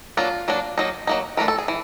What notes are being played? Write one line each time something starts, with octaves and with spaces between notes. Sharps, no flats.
F#3 A#3 D4 F4
F#3 A#3 D4
F#3 A#3 D#4
F#3 A#3 D#4
E3 A3 D4 A#4
A4
G#4
E3